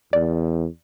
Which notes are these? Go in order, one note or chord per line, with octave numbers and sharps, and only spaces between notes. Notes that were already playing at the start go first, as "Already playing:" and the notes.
E2 D5